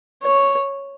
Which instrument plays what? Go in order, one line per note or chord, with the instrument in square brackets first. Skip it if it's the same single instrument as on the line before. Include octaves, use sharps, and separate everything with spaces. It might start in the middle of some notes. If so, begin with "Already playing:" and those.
[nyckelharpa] C#5